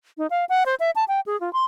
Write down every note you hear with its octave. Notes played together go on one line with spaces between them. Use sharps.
D#4
F5
F#5
C5
E5
A5
G5
G#4
F4
C6